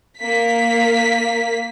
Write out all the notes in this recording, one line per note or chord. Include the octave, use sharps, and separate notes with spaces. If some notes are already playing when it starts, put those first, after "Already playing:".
A#3 B6